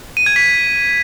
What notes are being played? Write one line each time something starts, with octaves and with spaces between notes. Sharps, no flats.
D#7
G#6
B6